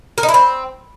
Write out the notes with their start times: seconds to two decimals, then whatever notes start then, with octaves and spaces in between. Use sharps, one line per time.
0.18 A#4
0.23 D#4
0.29 E4
0.34 C4